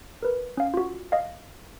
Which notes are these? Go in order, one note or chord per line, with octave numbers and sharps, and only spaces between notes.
A#4 B4
C#4 F5
F4 F#4
D#5 F5